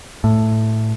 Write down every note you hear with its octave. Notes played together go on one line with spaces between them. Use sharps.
A2